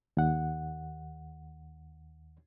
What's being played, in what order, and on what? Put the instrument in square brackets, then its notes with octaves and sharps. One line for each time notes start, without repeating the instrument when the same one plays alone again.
[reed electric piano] D#2 F#5